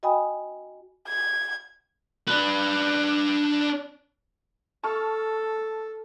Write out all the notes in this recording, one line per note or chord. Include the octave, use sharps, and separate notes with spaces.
F#4 D#5 G5 G#5 B5 D#6
G#6
D4 B4
A4 A5 C#6 F6